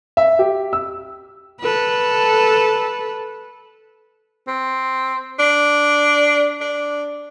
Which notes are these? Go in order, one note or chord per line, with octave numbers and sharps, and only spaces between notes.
E5
G4
E6
A4 B4
C4
D4
D4